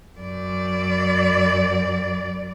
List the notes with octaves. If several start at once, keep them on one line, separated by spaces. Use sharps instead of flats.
F#2 D5